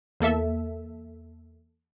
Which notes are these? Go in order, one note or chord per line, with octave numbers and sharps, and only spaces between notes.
E2 A#3 A4 E5